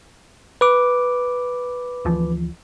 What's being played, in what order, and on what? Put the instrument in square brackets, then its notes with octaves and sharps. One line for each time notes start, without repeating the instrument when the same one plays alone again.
[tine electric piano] B4 D6
[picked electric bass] D2 E3 F3